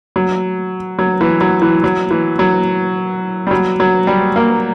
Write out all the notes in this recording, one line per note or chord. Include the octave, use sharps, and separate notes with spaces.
F#3
F#3
E3
F#3
E3
F#3
E3
F#3
G3
F#3
F#3
G3
A#3